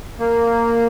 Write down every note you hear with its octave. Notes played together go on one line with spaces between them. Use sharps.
A#3